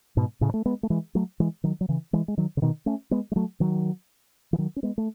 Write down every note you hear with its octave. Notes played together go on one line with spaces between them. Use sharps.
G#2 B2
A2 C#3
A3
G#3 B3
A3
E3 G#3
F#3 A3
E3 G#3
D#3 F#3
F#3
C#3 E3
E3 G#3
G#3
D#3 F#3
C#3
B2 D#3
A3 C#4
G#3 B3
G#3
F#3 A3
D#3 F#3
E3
D#3 F#3
C#4
G#3 B3
A3